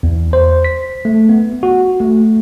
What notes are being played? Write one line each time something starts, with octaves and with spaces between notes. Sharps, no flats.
E2
C5
B6
A3
B3
F#4
A3